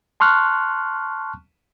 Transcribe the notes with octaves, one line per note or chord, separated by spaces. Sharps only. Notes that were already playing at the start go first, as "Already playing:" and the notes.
A5 C6 C#6 F6 F#6